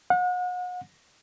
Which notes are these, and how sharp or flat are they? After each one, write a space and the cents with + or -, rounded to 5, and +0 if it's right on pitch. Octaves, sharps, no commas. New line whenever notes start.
F#5 -35